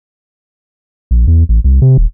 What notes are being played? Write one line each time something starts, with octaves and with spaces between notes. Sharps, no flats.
A#1
E2
A1
C2
C3
D#1